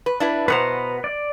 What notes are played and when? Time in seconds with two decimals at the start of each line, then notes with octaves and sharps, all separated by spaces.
0.06 B4
0.20 D4 E4 B4
0.48 B2 B3 B4 C5 F#5 A#5
1.04 D5